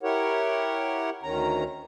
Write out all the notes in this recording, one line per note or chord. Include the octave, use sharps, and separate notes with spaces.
E4 G4 A#4 C#5 F#5
D2 D#3 C#4 A#5